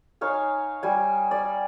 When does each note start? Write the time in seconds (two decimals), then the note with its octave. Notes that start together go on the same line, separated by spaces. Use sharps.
0.21 D#4 C#5 F5 G#5
0.83 G3 G#5
1.31 D5